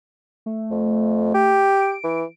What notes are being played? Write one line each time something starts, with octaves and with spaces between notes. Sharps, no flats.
A3
F2
G4
D7
E3